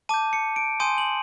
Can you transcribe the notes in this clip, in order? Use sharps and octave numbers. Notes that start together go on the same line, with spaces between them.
A5 D6 G6 D#7
C#7
D7
G#5 C6 D#6 G6 D#7
F#7